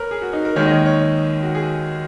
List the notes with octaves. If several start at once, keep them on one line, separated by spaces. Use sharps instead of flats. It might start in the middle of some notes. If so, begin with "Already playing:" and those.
Already playing: A#4 B4 C#5
G#4
F#4
D#4
A#4
D#2 D#3 G#3 C#5
D#5
C#5
C#5
F#4
G#4